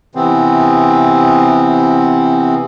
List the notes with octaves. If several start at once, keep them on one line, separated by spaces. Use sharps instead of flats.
C3 E3 B3 C4